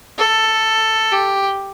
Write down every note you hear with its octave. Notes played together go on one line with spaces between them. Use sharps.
A4
G4